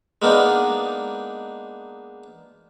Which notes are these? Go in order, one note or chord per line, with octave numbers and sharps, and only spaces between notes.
G#3 A#3 B3 D4 D#4